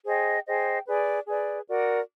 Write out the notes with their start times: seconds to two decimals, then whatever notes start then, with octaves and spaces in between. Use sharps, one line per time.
0.05 G#4 C5 D#5 G5
0.46 G#4 C5 D#5 G5
0.87 G#4 B4 D5
1.27 G#4 B4 D5
1.68 F#4 A#4 D5